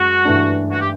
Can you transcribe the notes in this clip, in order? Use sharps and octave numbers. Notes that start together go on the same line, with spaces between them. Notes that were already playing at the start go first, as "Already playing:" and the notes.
Already playing: F#2 G#3 F#4
G2 E3 A3 D4
F#4
G4